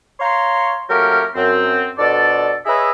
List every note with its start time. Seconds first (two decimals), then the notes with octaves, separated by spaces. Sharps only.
0.20 C#5 F5 A#5 C6
0.89 F#3 A3 A#3 C#4 G4 A#4
1.35 F#2 C4
1.98 F2 B2 D4 A4 D5
2.66 G#4 B4 C#5 D#5 E5